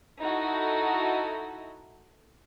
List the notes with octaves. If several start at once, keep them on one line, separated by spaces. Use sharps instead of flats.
D#4 E4 F#4 A4 D#5